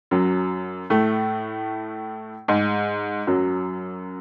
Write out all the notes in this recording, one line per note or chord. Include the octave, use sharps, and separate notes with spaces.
F#2 F#3
A2 A3
G#2 G#3
F#2 F#3